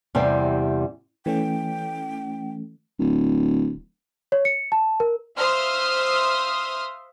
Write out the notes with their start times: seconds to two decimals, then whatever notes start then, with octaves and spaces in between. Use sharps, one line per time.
0.15 E2 C3 G3 C4
1.26 E3 A3 C#4 G5
2.99 D1
4.32 C#5
4.45 C#7
4.72 A5
5.00 A#4
5.38 C5 E5 F5 C6 D#6 F6